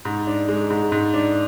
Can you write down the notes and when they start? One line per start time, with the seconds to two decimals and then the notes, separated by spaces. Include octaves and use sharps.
0.05 G#2
0.27 D4
0.48 G#3
0.70 G#2
0.92 G#2
1.14 D4